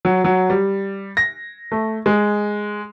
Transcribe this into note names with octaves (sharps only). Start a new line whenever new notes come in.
F#3
F#3
G3
A#6
A3
G#3